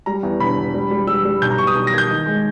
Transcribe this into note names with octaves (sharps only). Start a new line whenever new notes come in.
G3 A#5
E2
E1 B5
E1
G3
G3
G3 E6
G3
B1 G6
A#5
B1 C#6
D#6
B1
A#6
A#3 G#6
G6
D#3
G#3